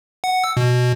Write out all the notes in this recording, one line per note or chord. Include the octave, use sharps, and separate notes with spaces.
F#5
E6
B2